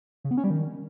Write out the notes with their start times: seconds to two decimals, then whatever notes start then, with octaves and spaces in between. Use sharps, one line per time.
0.24 C#3
0.31 B3
0.37 C#4
0.44 G3
0.50 D#3